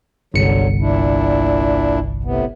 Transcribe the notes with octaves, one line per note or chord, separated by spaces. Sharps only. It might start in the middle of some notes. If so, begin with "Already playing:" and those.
G1 C2 D3 F#3 C#7
A#2 D4 E4
A2 C3 B3